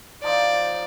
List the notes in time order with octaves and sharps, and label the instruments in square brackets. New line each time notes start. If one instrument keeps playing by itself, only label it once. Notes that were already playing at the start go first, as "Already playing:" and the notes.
[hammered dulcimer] F3 D#4 [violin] D5